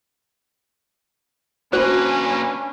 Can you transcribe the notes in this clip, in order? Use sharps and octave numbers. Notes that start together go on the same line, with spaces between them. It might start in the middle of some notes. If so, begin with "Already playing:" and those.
A#3 C#4 D4 F#4 B4 C5